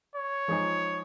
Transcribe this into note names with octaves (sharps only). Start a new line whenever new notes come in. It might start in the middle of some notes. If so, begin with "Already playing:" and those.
C#5
F3 G#3 D#4 G#4